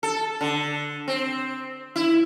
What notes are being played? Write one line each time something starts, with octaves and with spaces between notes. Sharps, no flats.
A4
D3
C4
E4